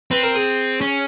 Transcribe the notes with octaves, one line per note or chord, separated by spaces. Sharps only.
C4 B4
A#4
G#4
C#4